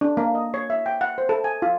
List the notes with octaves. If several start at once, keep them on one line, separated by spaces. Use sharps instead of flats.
D4
A#3
D#5
C#5
E5
G5
F#5
C5
A4
G#5
F4